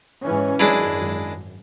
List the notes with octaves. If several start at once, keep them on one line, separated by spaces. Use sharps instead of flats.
G#2 E3 C#4
G#1 F#2 G#3 D4 E4